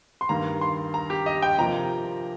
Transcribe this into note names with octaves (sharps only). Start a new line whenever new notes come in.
C6
G2 D#3 A#3 A#5
C6
A#5
G4
D#5
G5
C3 F3 A#3 A#5